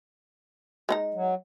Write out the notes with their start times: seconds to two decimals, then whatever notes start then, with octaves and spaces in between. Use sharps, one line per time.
0.89 G#3 D#4 A#5
1.14 F#3